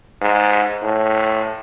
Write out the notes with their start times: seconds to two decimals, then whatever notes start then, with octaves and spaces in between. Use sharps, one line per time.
0.22 G#2
0.83 A2